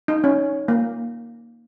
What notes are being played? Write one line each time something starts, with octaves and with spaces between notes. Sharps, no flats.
D#4
C#4
A#3